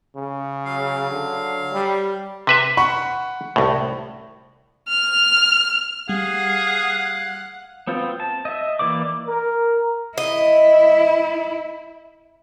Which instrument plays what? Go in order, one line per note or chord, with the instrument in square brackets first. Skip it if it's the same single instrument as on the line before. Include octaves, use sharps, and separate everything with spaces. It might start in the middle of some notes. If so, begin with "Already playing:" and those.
[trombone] C#3
[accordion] F#3 F5
[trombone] D3
G3
[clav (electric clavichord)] C3 B4 E5
[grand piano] F#5 B5 C#6
[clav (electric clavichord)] C2 A2
[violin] F6
[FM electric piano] G3 [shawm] G#4 [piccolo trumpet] F5 [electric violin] F#5
[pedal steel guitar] B3 C4 F4
A5
D#5 E5
E3 A#3 D5 D6
[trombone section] A#4
[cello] E4 [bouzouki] D#5